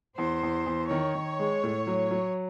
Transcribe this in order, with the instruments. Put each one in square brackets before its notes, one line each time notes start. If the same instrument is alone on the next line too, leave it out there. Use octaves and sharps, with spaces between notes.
[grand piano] E2 [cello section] C5
[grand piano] E2
E2
[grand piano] D#3 [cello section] C#5
[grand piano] D#3
G#3
A2
F#3
F#3